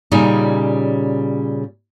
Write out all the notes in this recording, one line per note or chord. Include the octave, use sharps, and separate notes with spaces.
A#2 C#3 G3 C#4 D#4